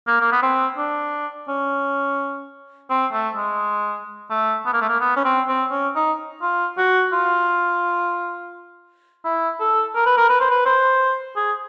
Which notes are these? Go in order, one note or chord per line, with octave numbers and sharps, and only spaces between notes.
A#3
A#3
B3
C4
D4
C#4
C4
A3
G#3
A3
B3
A#3
A3
A#3
B3
C#4
C4
C4
C#4
D#4
F4
F#4
F4
E4
A4
A#4
B4
A#4
B4
C5
B4
C5
G#4